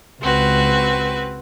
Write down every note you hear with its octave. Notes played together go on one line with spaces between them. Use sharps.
C#2 C4 F#4 B4